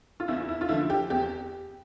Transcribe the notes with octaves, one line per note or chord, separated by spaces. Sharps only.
F4
E2 E4
E4
F4
D3 F3 E4
G4
E2 G4